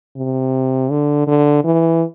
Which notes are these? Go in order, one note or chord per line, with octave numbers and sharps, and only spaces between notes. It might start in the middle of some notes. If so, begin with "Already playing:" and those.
C3
D3
D3
E3